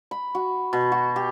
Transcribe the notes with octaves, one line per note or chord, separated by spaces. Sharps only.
B5
F#4
B2
F#4
G4